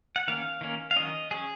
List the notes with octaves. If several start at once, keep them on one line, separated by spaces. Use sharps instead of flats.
F#5
D#3 A#3 C#4 F5
D#3 A#3 C#4
F5
D#3 F#3 C#4 D#5
F#3 C#4 G#4